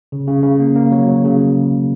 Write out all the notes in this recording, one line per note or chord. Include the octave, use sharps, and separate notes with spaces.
C#3
C#3
C#3
A#3
A#3
F#3
F#3
C#3